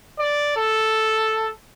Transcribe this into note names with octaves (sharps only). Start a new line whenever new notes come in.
D5
A4